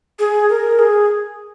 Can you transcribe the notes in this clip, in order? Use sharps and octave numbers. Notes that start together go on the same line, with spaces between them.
G#4
A#4
G#4